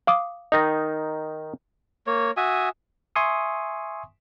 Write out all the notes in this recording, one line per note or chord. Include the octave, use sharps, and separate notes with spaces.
F5 D6 D#6
D#3 D#4 D#5 A#6
A#3 C#5
F#4 E5 G#5 D#6
E5 G#5 C6 C#6 D#6